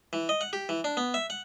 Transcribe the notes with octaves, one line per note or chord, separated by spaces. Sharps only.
E3
D#5
F#5
G4
E3
D4
B3
E5
F#5